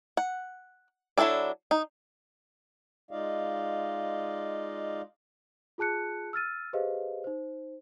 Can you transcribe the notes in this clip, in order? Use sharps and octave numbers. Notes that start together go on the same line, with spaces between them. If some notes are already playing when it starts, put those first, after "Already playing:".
F#5
F#3 D4 E4 A4 D5
D#4
G#3 D#4 F4 D5 D#5 F5
F4 G#4 A5 F#6 C#7
E6 F6 A6 D#7
G4 G#4 B4 C5 D#5 F5
D#4 C5